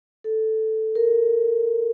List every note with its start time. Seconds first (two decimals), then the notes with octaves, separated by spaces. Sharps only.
0.24 A4
0.95 A#4